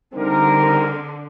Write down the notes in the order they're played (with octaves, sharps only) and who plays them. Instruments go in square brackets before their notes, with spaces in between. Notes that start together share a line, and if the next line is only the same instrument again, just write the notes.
[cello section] D3 [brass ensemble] G3 C4 D#4 G4 A#4